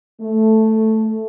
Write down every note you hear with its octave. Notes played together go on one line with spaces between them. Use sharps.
A3